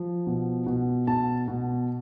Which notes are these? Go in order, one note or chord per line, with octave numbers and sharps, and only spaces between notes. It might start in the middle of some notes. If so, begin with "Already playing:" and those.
Already playing: F3
B2
B2
B2 A5
B2